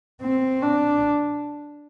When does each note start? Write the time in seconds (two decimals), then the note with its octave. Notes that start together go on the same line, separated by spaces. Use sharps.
0.22 C4
0.62 D4